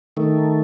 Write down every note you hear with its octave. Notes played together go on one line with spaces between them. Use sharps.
D#3 A3